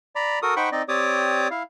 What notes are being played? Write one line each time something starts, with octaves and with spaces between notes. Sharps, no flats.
D5 A#5 B5
F#4 A4 A#4 D#6
D#4 C5 F#5 G5 B5 C#6
C4 D#4 D5 D#5
C4 G4 C#5 D5 D6 D#6
E4 F5